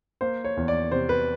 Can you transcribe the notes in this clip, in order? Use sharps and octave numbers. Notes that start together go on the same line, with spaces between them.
A#3 C5
C#5
E2
D5
C3 C5
B4